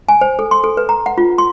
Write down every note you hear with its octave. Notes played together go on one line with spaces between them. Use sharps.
G#5
C5
A4
C6
A4
B4
A#5
F#5
F4
C6